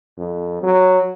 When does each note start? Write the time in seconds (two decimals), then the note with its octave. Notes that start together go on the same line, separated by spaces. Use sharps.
0.18 F2
0.63 F#3